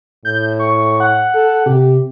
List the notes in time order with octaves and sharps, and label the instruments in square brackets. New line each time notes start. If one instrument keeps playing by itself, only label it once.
[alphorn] A2 [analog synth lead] G6
[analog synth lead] C#6
F#5
[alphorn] A4
[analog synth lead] C3 [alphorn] G4